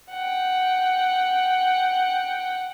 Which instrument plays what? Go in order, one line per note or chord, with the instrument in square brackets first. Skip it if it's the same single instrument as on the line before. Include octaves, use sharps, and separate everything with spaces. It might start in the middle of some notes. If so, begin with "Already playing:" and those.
[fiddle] F#5 G5